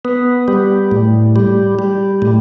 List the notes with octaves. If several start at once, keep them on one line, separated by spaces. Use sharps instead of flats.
B3
G3
A2
G3
G3
A2